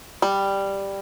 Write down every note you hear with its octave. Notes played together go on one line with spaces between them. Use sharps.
G3